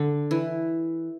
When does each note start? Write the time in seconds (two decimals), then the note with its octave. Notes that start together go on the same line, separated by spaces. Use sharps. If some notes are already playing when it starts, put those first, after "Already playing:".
Already playing: D3
0.31 E3